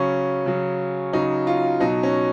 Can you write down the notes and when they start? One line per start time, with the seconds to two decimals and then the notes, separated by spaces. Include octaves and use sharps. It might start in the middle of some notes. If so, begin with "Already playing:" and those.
Already playing: C#3 F#3 C#4
0.46 C#3 F#3
1.13 C#3 F#3 D#4
1.47 F4
1.80 B2 F#3 D#4
2.03 C#4